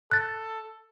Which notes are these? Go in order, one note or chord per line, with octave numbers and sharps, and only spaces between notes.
A4 F#6 A6